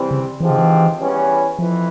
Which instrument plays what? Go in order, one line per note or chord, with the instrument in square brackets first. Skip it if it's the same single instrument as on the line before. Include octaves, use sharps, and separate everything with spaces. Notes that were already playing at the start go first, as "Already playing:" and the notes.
Already playing: [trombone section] C3 E3 G3 C4
[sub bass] C#3
[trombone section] G#2 F3 G#3 C4 G4 [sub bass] E3
[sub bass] C#3
E3
[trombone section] E2 E3 G3 C#4
[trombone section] F2 E3 [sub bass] F3